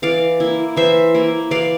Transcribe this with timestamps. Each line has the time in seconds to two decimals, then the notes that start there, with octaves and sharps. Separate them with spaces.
0.02 E3 D5 F5
0.40 A#3 E4
0.76 E3 C5 E5
1.14 A#3 E4
1.51 E3 D5 F5